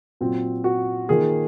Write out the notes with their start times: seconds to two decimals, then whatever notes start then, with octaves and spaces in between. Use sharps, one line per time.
0.21 A#2 F#3 C4
0.64 F#4
1.08 D#3 A#3 F4 G#4